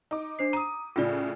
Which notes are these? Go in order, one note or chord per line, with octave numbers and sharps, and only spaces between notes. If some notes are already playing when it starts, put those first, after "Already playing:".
D#4 D6
D4 C5 C7
A#5 D#6 D#7
A2 C#3 F4 D5